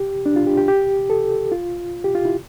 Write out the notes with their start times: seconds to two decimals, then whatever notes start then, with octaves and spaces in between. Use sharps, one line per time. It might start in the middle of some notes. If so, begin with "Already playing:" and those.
Already playing: G4
0.26 D4
0.36 F4
0.47 G4
0.57 G4
0.68 G4
1.10 A4
1.52 F4
2.04 G4
2.15 F4
2.25 E4